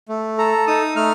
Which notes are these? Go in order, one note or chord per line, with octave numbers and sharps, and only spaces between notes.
A3
A4 A#5
D#4 D#6
A3 F6